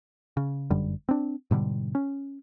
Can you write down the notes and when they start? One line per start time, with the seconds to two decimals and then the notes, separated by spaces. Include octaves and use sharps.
0.37 C#3
0.70 G1 F#2 D3 G3
1.09 C4 D4
1.51 G#2 B2 D3 G3
1.95 C#4